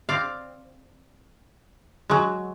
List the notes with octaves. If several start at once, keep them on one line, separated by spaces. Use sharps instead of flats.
C4 D5 F5
F#3 G#3